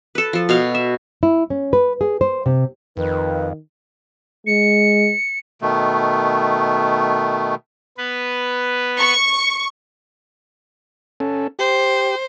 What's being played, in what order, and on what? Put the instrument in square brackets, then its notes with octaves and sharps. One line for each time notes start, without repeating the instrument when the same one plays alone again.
[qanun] A4 B4
F3 A4
B2 F5
E5
[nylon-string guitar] E4
C#4
B4
G#4
C5
C3
[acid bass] F2 [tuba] D#3 [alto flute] B4
[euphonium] G#3 [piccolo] C#7
[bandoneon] B2 D#3 A3
[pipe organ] B3 B4
[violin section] C#6
[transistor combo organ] C#4 A4
[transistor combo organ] G4 [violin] C5